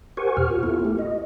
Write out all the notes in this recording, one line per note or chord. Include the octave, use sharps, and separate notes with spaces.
G4 A#4 C5 F#5 G#5 C#6
E2 B2 G4 F6
F4
B3 E4 F4 A4
A3 G4
D#5